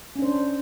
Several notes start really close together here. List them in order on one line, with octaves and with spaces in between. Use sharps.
C#4 D4 C5